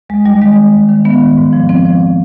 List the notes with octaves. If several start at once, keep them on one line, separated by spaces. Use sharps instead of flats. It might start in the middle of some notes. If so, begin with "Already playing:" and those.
D#2 G#3
D#2 G3
D#3 G#3
D#3
D#2
D#3
D#3 B3
D#3
G#2
F3
F3 C4
F3